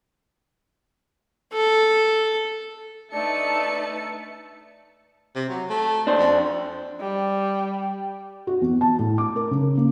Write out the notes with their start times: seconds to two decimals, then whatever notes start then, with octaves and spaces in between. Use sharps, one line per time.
1.53 A4
3.13 A3 D4 D#4 B4 E5 A5 C#7
5.35 C3
5.49 F#3
5.70 A3
6.07 D4 C5
6.18 F2
7.00 G3
8.47 F#4
8.61 E2
8.81 A5
8.99 A2
9.18 D6
9.36 A#4
9.51 C#3
9.77 A#3